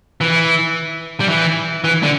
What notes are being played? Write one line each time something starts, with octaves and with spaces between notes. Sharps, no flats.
E3
G3
E3
E3
D3